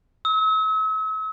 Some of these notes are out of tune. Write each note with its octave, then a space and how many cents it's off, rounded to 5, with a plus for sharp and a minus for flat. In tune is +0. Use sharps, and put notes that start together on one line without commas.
E6 -45